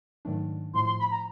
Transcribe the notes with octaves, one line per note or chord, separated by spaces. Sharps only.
G#2 D#3 F#3 A3 D4
A2 F3 A3 C6
C6
B5
A#5